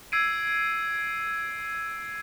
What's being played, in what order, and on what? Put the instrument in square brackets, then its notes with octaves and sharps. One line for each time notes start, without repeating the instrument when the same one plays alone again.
[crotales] E6 G#6 C7 D7 D#7